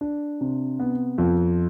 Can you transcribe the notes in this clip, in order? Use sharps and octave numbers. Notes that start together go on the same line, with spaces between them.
D4
C3
B3
F2